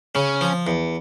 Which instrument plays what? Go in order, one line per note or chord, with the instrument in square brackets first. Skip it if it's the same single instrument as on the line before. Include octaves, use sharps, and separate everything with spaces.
[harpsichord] C#3 [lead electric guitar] C#4
[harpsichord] F3
E2